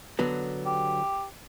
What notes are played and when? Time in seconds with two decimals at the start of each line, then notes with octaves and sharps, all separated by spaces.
0.19 D3 F#3 B3
0.66 G4